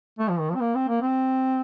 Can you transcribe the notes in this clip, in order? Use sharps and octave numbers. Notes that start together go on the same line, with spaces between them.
A3
F3
D#3
F3
C4
A#3
C4
A#3
C4